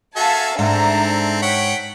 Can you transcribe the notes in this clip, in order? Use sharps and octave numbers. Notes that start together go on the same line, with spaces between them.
F#4 A4 E5 F5 G#5 A5
G#2 C4 D4 A4 E5 A#5
C#5 F#5 G5 B6